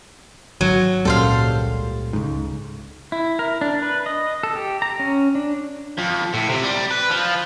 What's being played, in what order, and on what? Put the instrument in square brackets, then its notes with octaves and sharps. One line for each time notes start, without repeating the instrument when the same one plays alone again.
[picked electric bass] G#1 [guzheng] F#3
[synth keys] C#2 A#2 G3 [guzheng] A4 C5 F5
[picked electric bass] C#2 G#2
[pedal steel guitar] E4
A#4
D4
B4
D#5
A4
G4
A#5
C#4
D4
[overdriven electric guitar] F2
A2
C3
G3
B4
F3